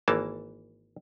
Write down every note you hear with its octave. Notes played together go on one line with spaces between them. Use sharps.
G#1 E3 A#3 A5